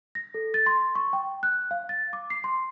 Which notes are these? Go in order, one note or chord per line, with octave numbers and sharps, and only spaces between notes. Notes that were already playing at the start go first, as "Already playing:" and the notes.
A#6
A4
A6
C6
C#6
G5
F#6
F5
A6
D6
C7
C6